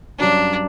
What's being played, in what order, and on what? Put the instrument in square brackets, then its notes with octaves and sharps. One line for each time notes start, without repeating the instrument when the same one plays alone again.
[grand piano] G2 F#3 C#4 [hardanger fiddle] D4